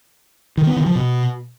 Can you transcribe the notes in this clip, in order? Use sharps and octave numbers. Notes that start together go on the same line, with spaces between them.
D#3
B3
D#3
F3
B2